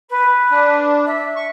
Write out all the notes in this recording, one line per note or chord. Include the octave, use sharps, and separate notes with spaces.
B4
D4
E5
C#6